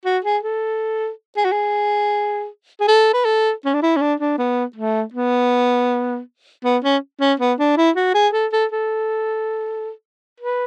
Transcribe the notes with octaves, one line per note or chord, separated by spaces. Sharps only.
F#4
G#4
A4
G#4
F#4
G#4
G#4
A4
B4
A4
C#4
D4
E4
C#4
D4
D4
B3
A3
B3
B3
C#4
C#4
B3
D4
E4
F#4
G#4
A4
A4
A4
B4